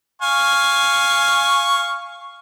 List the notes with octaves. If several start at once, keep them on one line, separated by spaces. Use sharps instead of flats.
F5 G#5 C#6